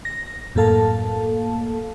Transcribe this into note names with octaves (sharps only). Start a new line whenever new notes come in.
A#6
F#2 A2 A#3 A4 F5 A5